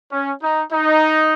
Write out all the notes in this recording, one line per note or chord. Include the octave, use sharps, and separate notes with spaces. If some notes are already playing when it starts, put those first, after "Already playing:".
C#4
D#4
D#4